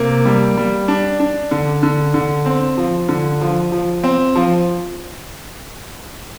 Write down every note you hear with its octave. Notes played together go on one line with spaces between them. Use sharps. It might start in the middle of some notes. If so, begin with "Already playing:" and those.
Already playing: C3 A#3
G3
G3
D4
D4
D3
D3
D3
C4
F3
D3
F3
F3
C4
F3